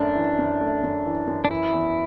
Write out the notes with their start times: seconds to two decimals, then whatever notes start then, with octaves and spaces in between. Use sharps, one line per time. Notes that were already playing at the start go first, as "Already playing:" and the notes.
Already playing: F#2 A3 D4
0.15 E3
0.39 F#2
0.61 A3
0.83 F#2
1.06 E3
1.27 F#2
1.45 D4
1.50 E3 E4
1.73 E2